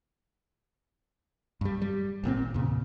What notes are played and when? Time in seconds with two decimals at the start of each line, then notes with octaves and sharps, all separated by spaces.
1.61 G2 G3
1.82 G3
2.24 G#1 A#2 C#3 C4
2.54 E2 A#2 C#3